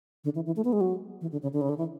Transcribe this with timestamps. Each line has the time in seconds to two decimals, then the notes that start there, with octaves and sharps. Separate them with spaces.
0.24 D3
0.35 E3
0.46 E3
0.56 A3
0.65 B3
0.73 G#3
0.81 F#3
1.21 E3
1.32 D3
1.42 C#3
1.53 D3
1.61 C#3
1.69 D3
1.78 E3